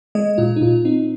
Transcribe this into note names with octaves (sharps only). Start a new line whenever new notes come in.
G#3 D#5
A#2 F4
D#4
A#2 F4
C4 D#4